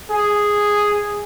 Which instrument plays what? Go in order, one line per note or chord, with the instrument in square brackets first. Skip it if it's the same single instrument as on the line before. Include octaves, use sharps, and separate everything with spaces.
[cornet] G#4